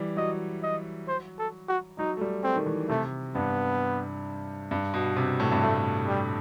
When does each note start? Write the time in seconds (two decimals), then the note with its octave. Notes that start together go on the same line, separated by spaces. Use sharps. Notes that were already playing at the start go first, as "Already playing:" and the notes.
Already playing: E3 G3
0.17 F#3 D#5
0.63 D#5
1.08 C5
1.38 A4
1.68 F#4
1.98 F#3 D#4
2.17 A3
2.21 G3
2.43 A3 C4
2.56 D#3
2.66 E3
2.89 C3 A3
3.35 G2 B3
4.71 G2
4.94 B2
5.16 C3
5.40 A2
5.52 G2
5.62 A2 A3
6.07 G3